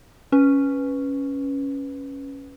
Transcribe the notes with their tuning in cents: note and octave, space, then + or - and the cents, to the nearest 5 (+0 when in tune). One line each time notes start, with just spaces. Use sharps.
C#4 +0 B4 +0